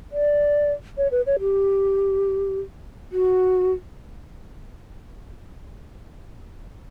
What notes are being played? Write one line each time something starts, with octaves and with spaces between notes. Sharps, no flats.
D5
C#5
B4
C#5
G4
F#4